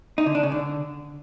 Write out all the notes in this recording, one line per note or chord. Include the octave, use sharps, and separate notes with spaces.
D#4
D3
D4
C#3
D3